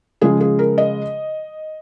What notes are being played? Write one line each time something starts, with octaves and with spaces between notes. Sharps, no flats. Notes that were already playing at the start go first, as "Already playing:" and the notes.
C#3 F3 G#3 G#4
G#4
A#4
D#5